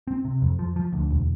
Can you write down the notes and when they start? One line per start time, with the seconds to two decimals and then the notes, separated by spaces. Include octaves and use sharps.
0.07 C4
0.25 C3
0.42 F2
0.59 F3
0.76 F3
0.93 D2
1.10 E1